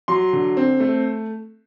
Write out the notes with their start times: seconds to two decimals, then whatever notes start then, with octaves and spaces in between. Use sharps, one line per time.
0.08 F#3 C6
0.33 D3
0.57 C4
0.80 A3